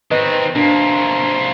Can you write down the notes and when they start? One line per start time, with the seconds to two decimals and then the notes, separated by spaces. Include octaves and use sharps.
0.11 D#3 C4 B4 D#5
0.55 C3 A#3 D4